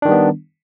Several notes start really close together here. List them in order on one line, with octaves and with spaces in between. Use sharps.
D4 D#3 G3 B3